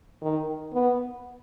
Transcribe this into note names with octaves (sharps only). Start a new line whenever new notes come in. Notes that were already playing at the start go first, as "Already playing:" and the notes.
D#3
B3